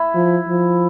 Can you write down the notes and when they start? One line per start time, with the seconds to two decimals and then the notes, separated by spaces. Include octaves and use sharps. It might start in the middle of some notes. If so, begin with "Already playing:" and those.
Already playing: E4
0.15 F3
0.49 F3